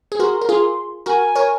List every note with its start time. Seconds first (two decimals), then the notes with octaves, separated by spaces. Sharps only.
0.12 G#4
0.19 F#4 A#4 C6
0.42 A#4
0.49 F4 G#4
1.06 F#4 A#4 G#5
1.35 A#4 C#5